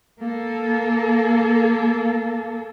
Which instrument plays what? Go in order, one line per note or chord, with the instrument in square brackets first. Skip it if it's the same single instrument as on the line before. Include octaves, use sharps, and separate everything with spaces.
[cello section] A#3 A4